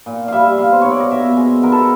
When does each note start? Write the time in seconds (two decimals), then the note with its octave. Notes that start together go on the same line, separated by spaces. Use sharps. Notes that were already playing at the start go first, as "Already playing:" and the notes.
0.06 A#2
0.28 G3 E5 F5
0.58 B3 F5
0.72 C5
0.81 A#2 C#5
0.91 D5
1.00 D#5
1.11 B2 E5
1.36 G#3
1.63 B3 A#4
1.72 A4